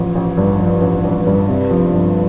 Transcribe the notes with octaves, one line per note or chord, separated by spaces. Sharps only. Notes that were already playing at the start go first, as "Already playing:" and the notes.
Already playing: A1 F3
A1
G2
F3
A1
A1
G2
C3
F3
G1